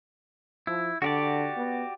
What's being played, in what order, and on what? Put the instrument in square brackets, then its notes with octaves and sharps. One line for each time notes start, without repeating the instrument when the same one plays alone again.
[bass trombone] F3 [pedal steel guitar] E4
[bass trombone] D3 [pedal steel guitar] F#4 G4 D5
[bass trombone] B3